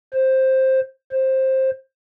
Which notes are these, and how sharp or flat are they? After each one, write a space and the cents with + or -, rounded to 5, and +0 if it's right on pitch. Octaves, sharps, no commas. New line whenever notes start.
C5 +10
C5 +15